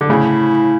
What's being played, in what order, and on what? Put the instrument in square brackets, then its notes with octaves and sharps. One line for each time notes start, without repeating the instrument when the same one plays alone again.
[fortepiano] D3
[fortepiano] A2 C#3 [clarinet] E4